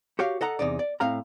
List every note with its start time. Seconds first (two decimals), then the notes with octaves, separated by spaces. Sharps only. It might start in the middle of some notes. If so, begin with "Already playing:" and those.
0.19 F#4 G4 C#5 F5
0.41 A4 D#5 F#5 A#5
0.59 E2 C3 D#4 D5
0.79 D5
1.00 A2 C4 F5 A#5